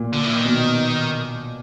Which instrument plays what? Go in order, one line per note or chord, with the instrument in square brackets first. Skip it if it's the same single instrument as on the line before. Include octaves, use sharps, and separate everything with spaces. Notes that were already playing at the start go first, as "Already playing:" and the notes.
Already playing: [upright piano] A#2
[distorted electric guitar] D3
E3
D#3
[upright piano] B2